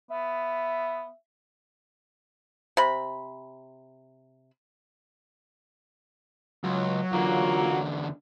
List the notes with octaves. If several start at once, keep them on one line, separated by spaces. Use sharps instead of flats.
B3 E5
C3 B5
C#2 F#3
E2 D3 A#3 F4